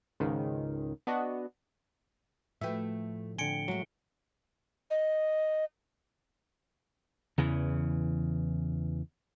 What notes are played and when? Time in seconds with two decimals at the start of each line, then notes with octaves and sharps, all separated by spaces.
0.20 C#2 G#2 D#3
1.07 B3 D4 F#4 D#5
2.61 A2 F3 A3 F#4 B4 E5 G5
3.38 D3 C4 G#5 C#7 D7 G7
3.68 F#3 G#3 A3
4.91 D#5
7.38 E2 C#3 E3